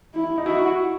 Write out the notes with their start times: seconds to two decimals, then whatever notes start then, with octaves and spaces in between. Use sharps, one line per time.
0.14 E4
0.38 D#4
0.46 E4 F#4